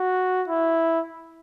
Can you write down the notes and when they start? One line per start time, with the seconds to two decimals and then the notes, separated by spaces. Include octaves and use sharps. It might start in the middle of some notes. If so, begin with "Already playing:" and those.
Already playing: F#4
0.48 E4